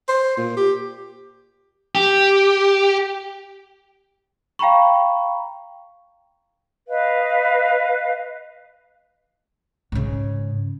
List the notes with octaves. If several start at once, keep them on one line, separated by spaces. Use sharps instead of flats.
C5
A#2
G4
G4
F5 G5 A#5 B5 C#6
B4 D#5 F5
G#2 C#3